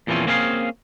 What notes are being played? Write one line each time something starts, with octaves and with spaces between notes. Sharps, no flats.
E2 A#2 E3 F3 C4 C#4
A#3 C4 C#4 G#4 D#5 F5